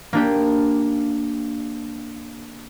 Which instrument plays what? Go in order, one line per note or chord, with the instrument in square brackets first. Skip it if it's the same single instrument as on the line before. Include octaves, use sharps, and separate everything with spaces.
[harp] A#3 D4 G4